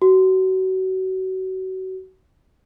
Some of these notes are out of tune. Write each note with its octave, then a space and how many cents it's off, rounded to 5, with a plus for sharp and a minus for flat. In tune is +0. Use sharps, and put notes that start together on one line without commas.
F#4 +30